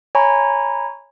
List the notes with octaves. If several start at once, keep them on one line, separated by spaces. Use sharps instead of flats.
C#5 G#5 A#5 B5 C#6